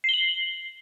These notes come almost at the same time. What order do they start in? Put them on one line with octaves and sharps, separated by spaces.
C7 G7 F#7